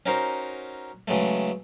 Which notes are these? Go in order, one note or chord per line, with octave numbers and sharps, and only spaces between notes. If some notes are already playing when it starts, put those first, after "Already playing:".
C#4 D#4 F#4 A#4 C5
C#3 E3 F#3 G#3 A3